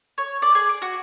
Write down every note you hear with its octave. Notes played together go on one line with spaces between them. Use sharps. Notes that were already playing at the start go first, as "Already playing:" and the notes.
C#5
D5
G#4
D6
F#4